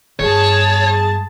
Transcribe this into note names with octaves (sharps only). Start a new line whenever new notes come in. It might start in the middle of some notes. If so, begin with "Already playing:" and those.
G2 B3 G#4 C#5 A5